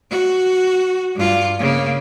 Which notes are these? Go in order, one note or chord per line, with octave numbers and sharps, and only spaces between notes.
F#4
G2 F4
C#3 A#3